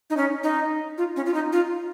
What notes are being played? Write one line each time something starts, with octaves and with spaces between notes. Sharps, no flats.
D#4
C#4
D#4
F4
C#4
F4
D#4
F4